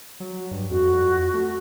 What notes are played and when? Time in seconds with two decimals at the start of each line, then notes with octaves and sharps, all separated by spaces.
0.20 F#3
0.51 G2
0.70 F2 F#4
1.34 A3